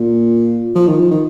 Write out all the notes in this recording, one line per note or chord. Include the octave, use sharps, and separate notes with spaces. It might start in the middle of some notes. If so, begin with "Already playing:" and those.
Already playing: A#2
F3
D#3
F3
D#3